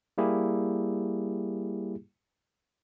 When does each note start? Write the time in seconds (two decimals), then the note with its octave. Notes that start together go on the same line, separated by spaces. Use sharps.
0.18 G3 A#3 E4 G4 G#4